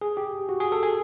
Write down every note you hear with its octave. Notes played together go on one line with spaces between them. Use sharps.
G#4
G4
F#4
G#4
A4
G#4